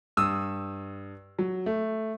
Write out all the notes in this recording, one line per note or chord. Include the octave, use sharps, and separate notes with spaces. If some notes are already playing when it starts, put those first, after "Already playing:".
G2 D#6 E6
F#3
A3